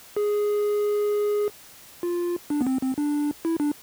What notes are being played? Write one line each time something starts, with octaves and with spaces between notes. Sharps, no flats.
G#4
F4
D4
B3
C4
C4
D4
E4
D4